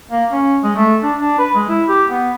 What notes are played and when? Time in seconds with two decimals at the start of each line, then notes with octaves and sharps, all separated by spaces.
0.11 A#3
0.32 C#4
0.63 G#3
0.76 A3
1.03 D4
1.17 D4
1.39 B4
1.55 G#3
1.69 E4
1.88 G4
2.09 B3